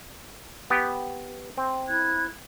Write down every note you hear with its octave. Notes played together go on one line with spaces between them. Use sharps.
B3 G4
C4
E4 F#6 G#6